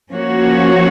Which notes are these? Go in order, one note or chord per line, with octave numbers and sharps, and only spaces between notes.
F3 A#3 C#4 F#4 C#5